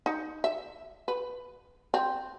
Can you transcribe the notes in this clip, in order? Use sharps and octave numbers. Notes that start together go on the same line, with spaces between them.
D#4
E5
B4
C4